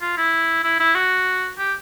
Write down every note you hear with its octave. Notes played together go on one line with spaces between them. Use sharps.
F4
E4
E4
E4
F#4
G4